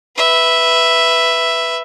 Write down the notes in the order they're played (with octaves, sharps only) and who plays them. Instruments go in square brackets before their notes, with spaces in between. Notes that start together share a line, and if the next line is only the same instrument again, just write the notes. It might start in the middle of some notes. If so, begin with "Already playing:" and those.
[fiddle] B4 E5